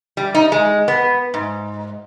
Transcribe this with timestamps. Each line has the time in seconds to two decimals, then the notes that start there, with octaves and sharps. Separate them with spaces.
0.17 G3
0.35 D#4
0.52 G#3
0.88 B3
1.34 G#2